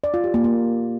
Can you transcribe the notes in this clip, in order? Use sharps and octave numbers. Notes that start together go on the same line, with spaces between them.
D5
F4
G4
A#3
A#3